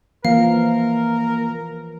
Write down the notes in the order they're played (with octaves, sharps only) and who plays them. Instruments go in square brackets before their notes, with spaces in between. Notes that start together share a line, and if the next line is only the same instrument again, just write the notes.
[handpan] E3 F3 [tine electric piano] A#3 [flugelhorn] A#4 [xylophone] F5